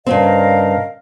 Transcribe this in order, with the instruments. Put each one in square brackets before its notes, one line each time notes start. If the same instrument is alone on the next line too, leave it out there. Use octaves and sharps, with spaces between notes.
[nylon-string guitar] G2 C#3 C4 [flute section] A#4 D#5 F5